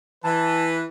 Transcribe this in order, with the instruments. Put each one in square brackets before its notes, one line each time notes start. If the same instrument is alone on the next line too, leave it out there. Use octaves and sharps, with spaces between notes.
[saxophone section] E3 [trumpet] B4 [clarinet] A5